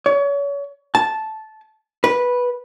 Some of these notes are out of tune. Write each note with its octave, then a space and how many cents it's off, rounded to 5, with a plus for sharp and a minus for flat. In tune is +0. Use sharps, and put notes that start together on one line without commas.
C#5 +35
A5 -10
B4 -10